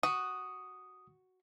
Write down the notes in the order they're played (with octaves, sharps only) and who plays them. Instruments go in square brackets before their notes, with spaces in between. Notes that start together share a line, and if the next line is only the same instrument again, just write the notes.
[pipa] F#4 [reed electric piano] D#6